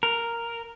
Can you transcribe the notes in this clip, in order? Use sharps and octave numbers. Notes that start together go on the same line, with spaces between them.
A#4